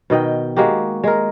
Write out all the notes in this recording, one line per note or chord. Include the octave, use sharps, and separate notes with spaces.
B2 D#3 D#5 G5
G#3 A#3 F#4 G4
G#3 A#4